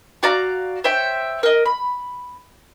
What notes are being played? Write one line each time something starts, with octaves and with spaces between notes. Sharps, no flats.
F#4 D5 F5 A#5
C5 C#5 E5 G5
A#4 D#5
B5